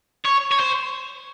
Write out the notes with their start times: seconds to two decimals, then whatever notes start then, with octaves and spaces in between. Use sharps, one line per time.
0.25 C#5
0.51 C#5
0.60 C5